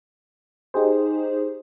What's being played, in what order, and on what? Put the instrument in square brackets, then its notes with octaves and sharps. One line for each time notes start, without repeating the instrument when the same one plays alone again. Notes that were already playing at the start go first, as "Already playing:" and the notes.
[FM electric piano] D#4 G4 G#4 C5